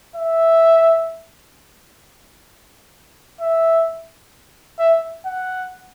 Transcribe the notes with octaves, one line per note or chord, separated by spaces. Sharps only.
E5
E5
E5
F#5